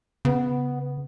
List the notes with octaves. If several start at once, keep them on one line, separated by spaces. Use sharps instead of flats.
C#3 B3